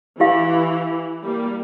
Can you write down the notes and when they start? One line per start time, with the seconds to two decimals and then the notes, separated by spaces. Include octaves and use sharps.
0.20 E3 E4 G4 F5
1.24 G3 A#3